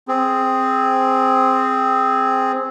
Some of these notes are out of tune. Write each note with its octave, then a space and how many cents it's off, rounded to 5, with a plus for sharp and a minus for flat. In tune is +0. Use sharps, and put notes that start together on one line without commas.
C4 +0 G#4 +0